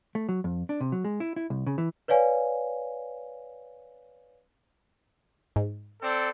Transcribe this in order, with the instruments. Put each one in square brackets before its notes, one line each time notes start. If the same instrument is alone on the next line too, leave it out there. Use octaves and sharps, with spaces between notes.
[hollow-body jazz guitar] A3
F#3
F2
D4
C3
F#3
G#3
E4
E4
C2
C#3
E3
[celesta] B4 C#5 D5 F5 G#5
[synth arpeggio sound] G#2
[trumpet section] C4 A4 D5